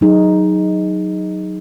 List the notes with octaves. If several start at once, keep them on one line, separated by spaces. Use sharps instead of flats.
F#3 D#4 G#4